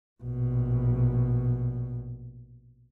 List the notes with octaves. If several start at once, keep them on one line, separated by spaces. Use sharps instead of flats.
A#1 B2